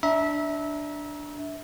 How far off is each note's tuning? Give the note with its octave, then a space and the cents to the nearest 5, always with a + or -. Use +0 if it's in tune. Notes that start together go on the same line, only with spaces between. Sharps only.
D4 +0 E5 -20 A#5 +30